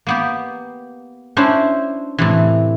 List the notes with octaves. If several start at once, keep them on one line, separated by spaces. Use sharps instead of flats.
A#3 B3 G4
C#4 D4 E4 C5
A2 C3 E3